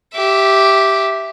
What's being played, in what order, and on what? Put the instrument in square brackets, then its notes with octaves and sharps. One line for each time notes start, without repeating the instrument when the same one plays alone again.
[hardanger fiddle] G4 E5